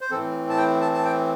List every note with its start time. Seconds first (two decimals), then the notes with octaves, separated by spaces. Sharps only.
0.01 C5
0.11 A2 E3 C4 A4
0.49 A5
0.58 G5
0.81 A5
0.94 A5
1.05 G5